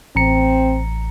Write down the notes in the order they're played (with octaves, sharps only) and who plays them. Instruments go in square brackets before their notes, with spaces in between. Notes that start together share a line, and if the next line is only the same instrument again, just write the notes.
[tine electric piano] A1 A#5 C#7 [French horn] C4